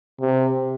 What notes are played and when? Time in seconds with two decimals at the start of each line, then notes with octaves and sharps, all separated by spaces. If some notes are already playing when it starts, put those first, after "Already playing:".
0.21 C3